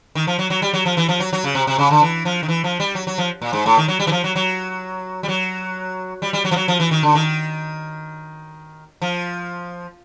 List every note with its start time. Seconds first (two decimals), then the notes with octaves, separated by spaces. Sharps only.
0.15 D#3
0.27 F3
0.39 F#3
0.50 F#3
0.62 G3
0.74 F#3
0.85 F3
0.97 E3
1.09 F3
1.20 F#3
1.33 F#3
1.44 C#3
1.55 C3
1.67 C3
1.78 C#3
1.91 D3
2.02 E3
2.25 F3
2.43 D#3
2.48 E3
2.64 F3
2.80 G3
2.95 F#3
3.07 F#3
3.18 F3
3.42 A#2
3.53 G#2
3.66 A2
3.77 D#3
3.88 F#3
4.00 G3
4.07 E3
4.12 F3
4.24 F#3
4.36 F#3
5.23 G3
5.28 F#3
6.22 G3
6.33 G3
6.45 F#3
6.51 F3
6.56 F#3
6.68 F3
6.80 E3
6.91 D#3
7.03 D3
7.15 D#3
9.02 F3